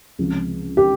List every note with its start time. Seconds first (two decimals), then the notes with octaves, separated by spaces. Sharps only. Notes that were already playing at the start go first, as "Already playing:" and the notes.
0.19 C#2 C3 F3
0.77 G4